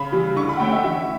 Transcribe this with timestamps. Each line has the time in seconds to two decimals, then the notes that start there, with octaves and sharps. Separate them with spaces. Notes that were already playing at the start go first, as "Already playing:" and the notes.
Already playing: C#3 B5
0.12 E3 G3
0.36 D3 C#6
0.49 B5
0.57 F#5
0.60 A3 C#4 G5
0.72 E5
0.84 E3 E5